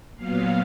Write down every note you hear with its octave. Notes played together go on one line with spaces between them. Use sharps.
A#2 F#3 B3 F5